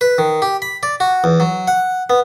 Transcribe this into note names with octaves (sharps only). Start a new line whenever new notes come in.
B4
D#3
G4
B5
D5
F#4
E2
F#3
F#5
B3